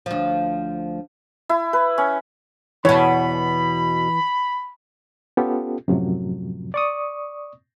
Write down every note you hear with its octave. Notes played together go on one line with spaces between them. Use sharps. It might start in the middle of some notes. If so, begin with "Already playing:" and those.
D2 F3
E4
B4
C#4
E2 B2 E3 C#5 B5
B3 C#4 F4 G4 A4
F#2 A2 C3 F3 F#3
D5 C#6 D#6